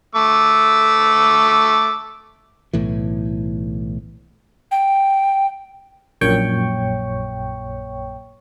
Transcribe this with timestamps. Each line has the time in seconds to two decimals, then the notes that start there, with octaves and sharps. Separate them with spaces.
0.15 A3 D6 E6
2.73 B1 A2 E3
4.71 G5
6.21 A#1 F#2 A#2 C#5 G5 C#6